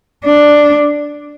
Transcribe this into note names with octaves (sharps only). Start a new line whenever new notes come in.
D4